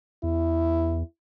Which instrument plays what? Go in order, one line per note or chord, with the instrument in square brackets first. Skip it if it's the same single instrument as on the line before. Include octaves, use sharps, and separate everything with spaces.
[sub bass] E2 [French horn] E4